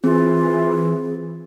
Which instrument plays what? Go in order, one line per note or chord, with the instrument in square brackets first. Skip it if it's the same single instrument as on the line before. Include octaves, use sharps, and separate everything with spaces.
[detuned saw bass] E3 [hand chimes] C4 [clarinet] F4 [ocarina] G#4